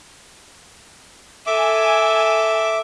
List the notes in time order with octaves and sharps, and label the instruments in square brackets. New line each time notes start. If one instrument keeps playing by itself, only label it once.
[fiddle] A4 [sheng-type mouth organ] E5 D6 [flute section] G#5